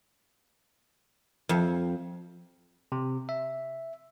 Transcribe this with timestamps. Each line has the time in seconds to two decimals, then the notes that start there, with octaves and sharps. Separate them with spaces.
1.49 F2
2.92 C3
3.29 E5